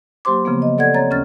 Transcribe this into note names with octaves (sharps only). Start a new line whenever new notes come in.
F#3 A#3 G4 C5 C6 D6
C#3 F3 A#3 B3
D#5
A4 D5 F#5 G#6
C4 C#5 A#5 A6
D#2 C#4 F6 A6